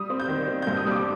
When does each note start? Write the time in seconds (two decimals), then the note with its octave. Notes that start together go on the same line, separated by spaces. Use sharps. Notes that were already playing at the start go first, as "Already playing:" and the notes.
Already playing: G3 D#6
0.10 C4
0.20 G6
0.28 D#3
0.48 C4
0.62 G2 G6
0.77 D#6
0.86 G3 D6